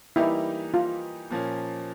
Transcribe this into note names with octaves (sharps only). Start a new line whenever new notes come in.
E3 G3 A#3 D#4 E4 G4
F4
A#2 F3 A#3 C#4